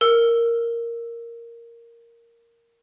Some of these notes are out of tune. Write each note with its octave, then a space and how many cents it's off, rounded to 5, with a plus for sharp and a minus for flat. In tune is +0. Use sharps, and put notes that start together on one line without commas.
A#4 -5 E6 +10